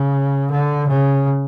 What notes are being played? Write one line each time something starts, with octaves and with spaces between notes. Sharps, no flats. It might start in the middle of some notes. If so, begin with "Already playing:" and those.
Already playing: C#3
D3
C#3